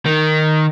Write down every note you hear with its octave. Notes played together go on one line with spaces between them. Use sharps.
D#3